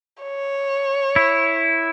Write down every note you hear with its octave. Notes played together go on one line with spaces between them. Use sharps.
C#5
E4